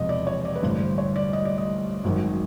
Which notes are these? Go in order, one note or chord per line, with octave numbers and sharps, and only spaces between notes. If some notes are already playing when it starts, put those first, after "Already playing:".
Already playing: E1 E2 C3 F3 D#5
D5
C#5
D5
B4
A1 G2 D3 C5
C5
C#5
D5
D#5
D5
D#5
G#1 F#2 D#3